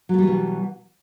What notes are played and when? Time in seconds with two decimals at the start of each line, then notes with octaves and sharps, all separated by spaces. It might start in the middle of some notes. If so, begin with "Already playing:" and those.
0.09 F#3
0.14 A3
0.18 G3
0.23 E3
0.28 B2